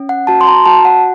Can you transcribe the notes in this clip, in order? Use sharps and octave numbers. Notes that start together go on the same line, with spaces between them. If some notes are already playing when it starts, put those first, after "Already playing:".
Already playing: C#4
F#5
F#4 A5
C6
A#5
F#4 A5
F#5